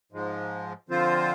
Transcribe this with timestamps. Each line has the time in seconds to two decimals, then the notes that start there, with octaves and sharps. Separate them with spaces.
0.12 G#2 F3 G#3
0.89 D3 F3 C4 F4 C5